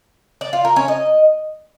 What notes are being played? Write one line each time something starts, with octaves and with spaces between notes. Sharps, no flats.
D5
F4
A#4
C#4
D#5